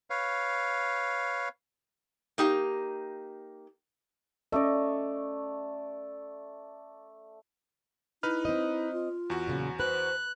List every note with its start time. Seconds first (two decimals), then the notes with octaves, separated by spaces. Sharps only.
0.10 B4 C#5 F5
2.38 A#3 D#4 G4
4.52 A3 C#4 D5 D#5
8.23 D#4 E4 B4 F6
8.45 C4 D#5
8.93 F4
9.30 E2 F#4
9.47 A#2 C#3 F#3
9.80 B4 C5 F#6